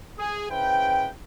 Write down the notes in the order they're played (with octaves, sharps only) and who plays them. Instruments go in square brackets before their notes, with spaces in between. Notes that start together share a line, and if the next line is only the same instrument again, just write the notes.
[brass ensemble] G#4
C#3 E4 B4 C5 G5